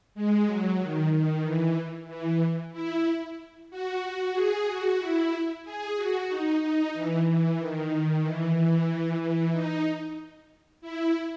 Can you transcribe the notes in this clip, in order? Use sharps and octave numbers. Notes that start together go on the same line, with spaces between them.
G#3
F#3
D#3
D#3
E3
E3
E4
F#4
G#4
F#4
E4
G#4
F#4
D#4
D#4
E3
E3
D#3
E3
E3
E3
D#4
E4